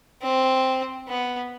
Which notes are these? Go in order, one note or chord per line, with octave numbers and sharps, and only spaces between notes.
C4
B3